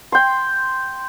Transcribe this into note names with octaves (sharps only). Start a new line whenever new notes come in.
G5 C6